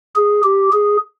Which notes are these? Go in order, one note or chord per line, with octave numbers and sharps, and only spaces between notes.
G#4
G4
G#4